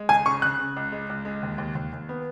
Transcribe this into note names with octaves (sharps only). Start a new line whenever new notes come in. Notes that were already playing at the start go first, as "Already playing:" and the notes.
Already playing: G#3
C#2 G#5
C#3 C#6
C#3 F#6
C#3
C#2
G#3
C#2
G#3
D#2
D#2
D#2
D#2
B3